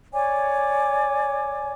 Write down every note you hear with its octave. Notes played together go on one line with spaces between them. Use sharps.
C#5 D5 G#5 D6